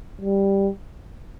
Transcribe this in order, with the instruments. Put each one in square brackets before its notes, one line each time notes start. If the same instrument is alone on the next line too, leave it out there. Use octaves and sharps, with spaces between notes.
[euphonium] G3